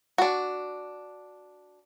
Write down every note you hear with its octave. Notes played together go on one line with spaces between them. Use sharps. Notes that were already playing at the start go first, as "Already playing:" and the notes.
D4 F#4